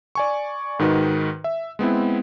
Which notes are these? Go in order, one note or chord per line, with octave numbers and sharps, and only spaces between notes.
D5 G#5 C#6
G#2 D#3 D#4 F#4 B4
E5
G#3 B3 C4 E4